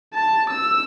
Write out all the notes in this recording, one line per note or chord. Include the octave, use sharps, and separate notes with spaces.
A5
E6